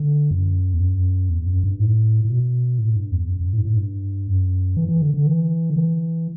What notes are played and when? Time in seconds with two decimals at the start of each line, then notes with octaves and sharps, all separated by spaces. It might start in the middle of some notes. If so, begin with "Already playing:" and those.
Already playing: D3
0.31 F#2
0.74 E2
0.80 F#2
1.30 E2
1.46 F#2
1.64 G2
1.80 A2
2.25 A2
2.30 B2
2.79 A2
2.96 G2
3.11 E2
3.29 F#2
3.41 F#2
3.53 A2
3.65 A2
3.77 G2
4.27 F#2
4.77 E3
4.88 E3
5.02 D3
5.14 D3
5.27 E3
5.70 D3
5.76 E3